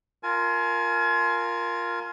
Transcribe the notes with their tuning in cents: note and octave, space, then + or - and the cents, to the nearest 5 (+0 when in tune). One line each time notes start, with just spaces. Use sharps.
F4 +0 A#4 -5 G#5 +30